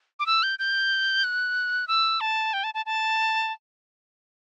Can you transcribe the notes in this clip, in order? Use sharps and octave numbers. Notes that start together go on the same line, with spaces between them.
D6
E6
G6
G6
F#6
E6
A5
G5
A5
A5
A5